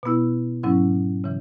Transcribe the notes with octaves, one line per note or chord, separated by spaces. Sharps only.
B2 B3 E4
G#2 F#3 C#4 E4
C#3 E3